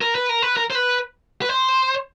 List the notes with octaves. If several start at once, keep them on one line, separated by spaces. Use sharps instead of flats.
A#4
B4
A#4
B4
A#4
C5
B4
B4
C5